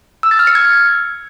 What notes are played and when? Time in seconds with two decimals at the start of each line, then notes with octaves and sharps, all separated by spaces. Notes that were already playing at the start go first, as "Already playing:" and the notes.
0.23 E6
0.31 A6
0.39 F6
0.47 C#7
0.55 G#6